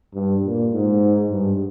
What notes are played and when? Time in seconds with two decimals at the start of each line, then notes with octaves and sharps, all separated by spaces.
0.14 G2
0.44 A#2
0.73 G#2
1.31 G2